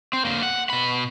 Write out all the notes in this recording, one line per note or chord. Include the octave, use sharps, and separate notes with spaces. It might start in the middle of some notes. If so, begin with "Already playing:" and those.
C4
D3 A#3
F#5
B2 B5